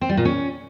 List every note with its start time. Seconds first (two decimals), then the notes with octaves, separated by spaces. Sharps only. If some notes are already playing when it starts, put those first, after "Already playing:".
0.01 C4
0.09 G3
0.17 A#2
0.25 C#4